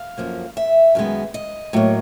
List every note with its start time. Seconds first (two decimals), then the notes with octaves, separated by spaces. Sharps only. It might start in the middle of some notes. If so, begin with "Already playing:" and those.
Already playing: F5
0.18 F#2 D3 F3 A#3
0.57 E5
0.95 F#2 D#3 G#3 B3
1.34 D#5
1.73 A2 F#3 A#3